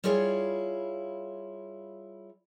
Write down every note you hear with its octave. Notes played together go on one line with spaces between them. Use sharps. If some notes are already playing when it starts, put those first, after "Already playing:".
G3 E4 F4 G#4 C#5 F5